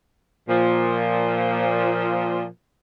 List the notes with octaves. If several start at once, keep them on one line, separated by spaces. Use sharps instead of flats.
A#2 F3